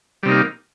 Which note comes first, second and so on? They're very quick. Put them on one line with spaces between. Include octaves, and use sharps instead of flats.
G3 C3 D#4 A#3